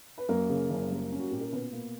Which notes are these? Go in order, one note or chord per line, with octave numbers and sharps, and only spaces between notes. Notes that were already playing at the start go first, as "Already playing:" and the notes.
B4
F#2 A#3 A#4
C#3
F#1
G3
C#4
F#4
A#2 G4
A#4
B2 B3 B4
A#3